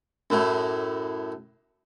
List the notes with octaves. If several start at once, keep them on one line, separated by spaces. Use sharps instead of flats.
F#2 A2